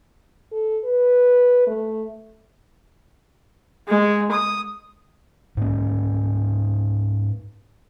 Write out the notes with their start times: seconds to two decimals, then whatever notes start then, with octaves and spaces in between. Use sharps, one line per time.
0.52 A4
0.84 B4
1.67 A3
3.88 G#3
4.32 D#6
5.57 G#2 A#3 C#4